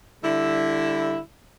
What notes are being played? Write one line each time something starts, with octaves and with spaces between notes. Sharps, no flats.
D3 G3 E4